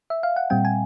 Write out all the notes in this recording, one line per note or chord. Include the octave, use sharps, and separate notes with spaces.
E5
F5
F#5
A#2 G3 C4 G5
G#5